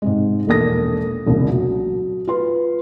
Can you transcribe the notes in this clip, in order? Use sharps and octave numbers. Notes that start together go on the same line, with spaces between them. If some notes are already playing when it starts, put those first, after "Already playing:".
G#2 C3 G#3
E1 A#1 A#3 A4 D#6 A#6
E1 C2 A#2 C#3
F#3
F4 B4 C6